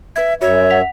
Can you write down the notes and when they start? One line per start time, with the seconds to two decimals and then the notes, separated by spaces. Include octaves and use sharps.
0.16 B4 E5 G#6
0.41 F#2 F#4 C#5 E5
0.70 F#5 B6 F7